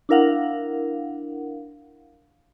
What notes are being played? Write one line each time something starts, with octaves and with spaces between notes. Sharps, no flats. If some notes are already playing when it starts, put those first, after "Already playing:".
D4 E4 A#4 F5 F#5